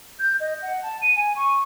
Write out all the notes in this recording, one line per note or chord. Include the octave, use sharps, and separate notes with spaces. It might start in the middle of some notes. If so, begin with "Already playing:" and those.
G6
D#5
F#5
A5
D#7
G#5
C#6